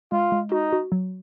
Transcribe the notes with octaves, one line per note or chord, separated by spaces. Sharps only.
G#3 F4
G#3
D#4 F#4
F#4
F#3